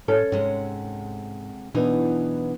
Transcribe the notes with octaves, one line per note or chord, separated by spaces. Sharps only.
A2 C#4 A4
G#2 C3 G#3 F#5
B2 E3 F#3 B3 D4 D#4